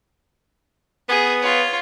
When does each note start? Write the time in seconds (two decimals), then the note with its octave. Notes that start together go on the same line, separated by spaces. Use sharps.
1.09 B3 G#4
1.42 F4 C#5